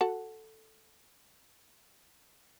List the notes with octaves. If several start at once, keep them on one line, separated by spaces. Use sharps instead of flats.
F#4 A4 F#5